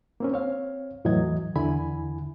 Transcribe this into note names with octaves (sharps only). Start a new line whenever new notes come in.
A#3 C4 C#4
C4 C#5 F5
E2 A2 E3 F#3 D#5 G#6
E2 D3 E4 G#5 B5